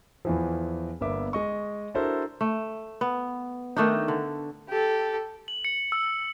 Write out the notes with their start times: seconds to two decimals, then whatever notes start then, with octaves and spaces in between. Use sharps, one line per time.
0.25 E2 E3 F3
1.01 G1 A#3 B3 E5 D6
1.33 G#3 D#5 C#6
1.94 D4 E4 F#4 A4 A#4 C5
2.41 A3
3.01 B3
3.76 D#3 A3 D4 D#4
4.08 D3
4.69 G4 A4
5.48 F#7
5.64 C#7
5.92 E6